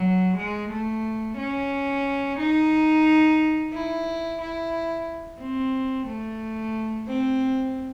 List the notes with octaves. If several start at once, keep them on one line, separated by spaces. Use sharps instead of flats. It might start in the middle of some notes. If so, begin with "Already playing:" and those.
Already playing: F#3
G#3
A3
C#4
D#4
E4
E4
C4
A3
C4